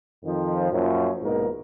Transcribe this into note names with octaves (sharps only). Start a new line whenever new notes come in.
F2 D#3 F3
F#2 A#2 F3 C#4
A#1 G#2 B2 A#4